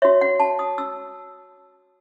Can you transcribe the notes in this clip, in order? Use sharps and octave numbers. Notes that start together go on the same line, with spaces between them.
F#4 C#5 E5
F#5
A5
D#6
E6